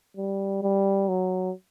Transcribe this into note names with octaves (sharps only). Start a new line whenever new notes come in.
G3
G3
F#3